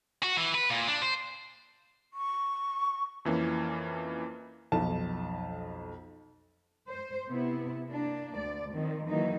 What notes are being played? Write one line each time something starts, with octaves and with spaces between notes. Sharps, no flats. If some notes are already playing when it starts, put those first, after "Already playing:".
F#4
E3
B4
A#2
D4
C5
C#6
F2 E3 A#3 C#4
B1 F2 A5
C5
C3 B3 E4
A#3 D4
D2 D5
D#3 F3 C4
D#3 E3 F#3 A#3 D#4